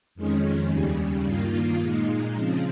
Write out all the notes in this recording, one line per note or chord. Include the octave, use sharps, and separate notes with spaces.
F2 D#3 G#3 C#4
D#2 C#3 G3
G2 D#3 A#3 F4
A#2 G#3 D#4
C#3 F3 C4